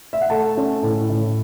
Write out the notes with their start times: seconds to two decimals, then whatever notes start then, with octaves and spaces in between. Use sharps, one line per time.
0.13 E5
0.21 F#5
0.30 A3 A5
0.57 C#4
0.83 A2
1.10 A2